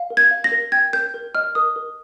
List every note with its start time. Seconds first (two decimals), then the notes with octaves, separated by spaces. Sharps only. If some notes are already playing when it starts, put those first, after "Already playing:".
Already playing: F5
0.10 A#4
0.17 G#6
0.31 F5
0.44 A#6
0.52 A#4
0.72 G5 G#6
0.93 A#4 G6
1.14 A#4
1.35 D#5 F6
1.55 A#4 D#6
1.76 A#4